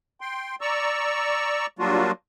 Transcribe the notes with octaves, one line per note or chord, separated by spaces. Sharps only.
G5 C6
D5 A#5 C#6 E6
F#3 G3 A#3 D4 F4 F#4